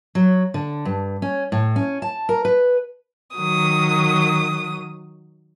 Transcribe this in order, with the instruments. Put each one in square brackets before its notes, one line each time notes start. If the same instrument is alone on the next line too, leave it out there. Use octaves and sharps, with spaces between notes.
[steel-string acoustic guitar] F#3
D3
G2
C#4
A2
C#4
A5
A#4
B4
[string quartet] D#3 F#3 D#6